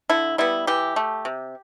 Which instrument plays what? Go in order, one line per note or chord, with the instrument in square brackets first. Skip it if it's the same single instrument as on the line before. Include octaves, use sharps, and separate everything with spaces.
[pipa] D3 E4
G3 B3 E4
E3 G4
A3
C3